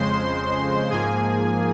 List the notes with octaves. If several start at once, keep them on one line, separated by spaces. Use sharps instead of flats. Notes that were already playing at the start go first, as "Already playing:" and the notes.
Already playing: F2 C#3 G#3 C5 C6
G#2 F3 A#3 G#4 G#5